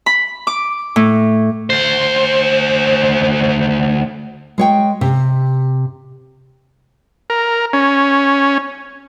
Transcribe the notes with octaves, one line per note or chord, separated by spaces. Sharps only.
B5
D6
A2
D2 C5
G#3 C#5 G5
C3
A#4
C#4